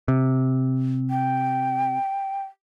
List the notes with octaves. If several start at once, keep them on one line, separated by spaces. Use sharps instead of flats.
C3
G5